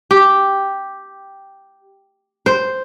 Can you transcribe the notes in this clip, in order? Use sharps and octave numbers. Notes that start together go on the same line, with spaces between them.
G4
C5